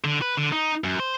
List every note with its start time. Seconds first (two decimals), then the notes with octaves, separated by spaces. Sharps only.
0.04 D3
0.22 B4
0.37 D3
0.52 D#4
0.84 F#2
1.00 C5